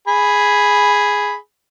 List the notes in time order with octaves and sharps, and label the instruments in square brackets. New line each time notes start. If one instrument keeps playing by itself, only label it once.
[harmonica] G#4 B5